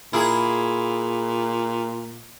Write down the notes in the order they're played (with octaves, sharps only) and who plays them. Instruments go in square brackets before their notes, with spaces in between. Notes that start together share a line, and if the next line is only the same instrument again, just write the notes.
[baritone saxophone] A#2 [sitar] E4 G#4